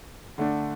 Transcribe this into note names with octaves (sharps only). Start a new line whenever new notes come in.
D3 A3 D4